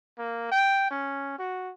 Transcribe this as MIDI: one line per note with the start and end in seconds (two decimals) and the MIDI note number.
0.19 0.49 58
0.52 0.89 79
0.91 1.35 61
1.39 1.72 66